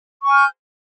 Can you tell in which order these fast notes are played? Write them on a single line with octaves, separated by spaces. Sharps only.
C#6 G#5 F6 G6